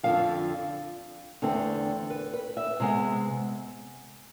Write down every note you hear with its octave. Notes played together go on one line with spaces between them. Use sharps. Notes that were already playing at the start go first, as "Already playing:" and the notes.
F2 D3 F3 F5
E2 D3 A3 C4
B4
B4
E5
C3 G#3 B3